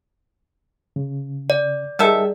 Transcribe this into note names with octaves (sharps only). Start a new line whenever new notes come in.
C#3
D5
D#3 G3 G#4 A4 E5